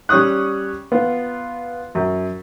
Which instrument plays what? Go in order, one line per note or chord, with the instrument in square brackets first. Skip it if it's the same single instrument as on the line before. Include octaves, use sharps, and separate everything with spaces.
[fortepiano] G3 C#4 C#6 D#6 F#6
B3 F4
F#2